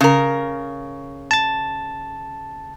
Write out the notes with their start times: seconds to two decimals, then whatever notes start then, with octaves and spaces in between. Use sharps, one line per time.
0.01 C#3 A#4
1.31 A5 A6